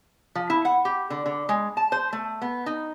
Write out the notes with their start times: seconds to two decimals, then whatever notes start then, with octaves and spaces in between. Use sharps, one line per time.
0.35 F3
0.50 E4
0.65 F#5
0.85 G4
1.10 D3
1.26 D3
1.49 G#3
1.77 A5
1.92 C5
2.13 A3
2.41 B3
2.66 D#4